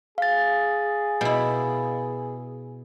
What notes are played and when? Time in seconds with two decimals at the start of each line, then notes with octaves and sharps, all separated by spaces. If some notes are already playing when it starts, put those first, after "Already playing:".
0.18 G#4 F5 A6
1.21 B2 E4